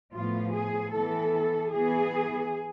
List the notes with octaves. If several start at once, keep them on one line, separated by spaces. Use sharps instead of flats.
A2 F3 B3 F4
G#4
E3 B3 A4
E3 B3 G#4